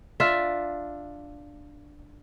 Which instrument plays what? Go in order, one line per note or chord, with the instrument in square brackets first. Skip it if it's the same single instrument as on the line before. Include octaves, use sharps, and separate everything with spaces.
[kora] D4 F4 E5